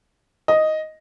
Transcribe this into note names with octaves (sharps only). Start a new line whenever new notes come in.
D#5